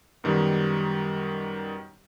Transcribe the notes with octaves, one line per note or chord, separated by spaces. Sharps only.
F#2 B2 D#3 G3